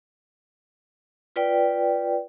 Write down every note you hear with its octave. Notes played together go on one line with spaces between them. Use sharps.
F4 B4 D5 G5